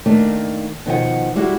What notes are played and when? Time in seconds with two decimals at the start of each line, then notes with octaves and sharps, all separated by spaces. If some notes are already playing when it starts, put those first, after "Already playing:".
0.06 D#3 A3 A#3 D4
0.86 B2 D#3 F3 F#5
1.36 G3 G#3 E4 F#4